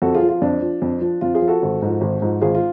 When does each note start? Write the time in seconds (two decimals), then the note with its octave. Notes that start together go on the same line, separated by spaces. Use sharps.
0.02 F2 F#4 A4
0.14 F4 G#4
0.22 F3
0.29 F4
0.42 F2 D4
0.62 F3
0.82 F2
1.01 F3
1.21 F2 F4
1.35 F4 G#4
1.42 F3
1.48 F#4 A4
1.62 G#1
1.82 G#2 F3
2.01 G#1
2.22 G#2 F3
2.41 G#1 F4 G#4
2.55 F4